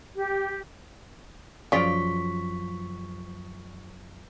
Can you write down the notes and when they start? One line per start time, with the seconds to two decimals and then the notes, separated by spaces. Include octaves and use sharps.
0.15 G4
1.72 F#2 C#3 F3 F4 D5 C#6 B6